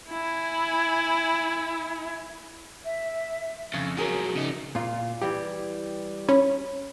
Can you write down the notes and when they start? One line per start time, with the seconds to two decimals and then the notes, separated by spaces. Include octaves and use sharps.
0.10 E4 G#5
2.84 E5
3.74 F2 C#3
3.97 B2 F3 F#3 G#4 A#4
4.35 C#3 D#4
4.75 A#2 F4
5.22 E3 G3 G4
6.29 C#4 B5